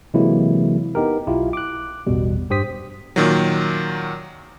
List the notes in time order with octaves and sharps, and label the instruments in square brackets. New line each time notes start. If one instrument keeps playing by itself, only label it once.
[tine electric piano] C3 E3 F#3 G#3 A#3 E4
B3 D#4 G4 A#4
B1 E4 F4 G4
D6 F#6
A1 E2 B2 G3
G2 G4 C5 D#6 B6
[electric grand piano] A#2 D#3 F#3